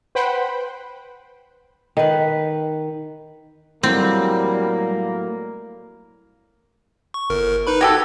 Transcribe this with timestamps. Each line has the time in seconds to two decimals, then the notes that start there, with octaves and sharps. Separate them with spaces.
0.15 B4 C5 F#5 G5 B5
1.97 D#3 B4
3.83 A2 F#3 G3 A#3 C4
7.14 C#6
7.30 G1 A#4
7.67 D#4 B4 B5
7.81 F#4 G4 A4 G#6